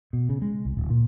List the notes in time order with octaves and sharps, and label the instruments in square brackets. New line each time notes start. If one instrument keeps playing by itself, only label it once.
[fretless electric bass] B2
C#3
G#3
C2
D1
A#2